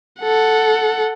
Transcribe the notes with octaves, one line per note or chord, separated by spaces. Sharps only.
A4 F#5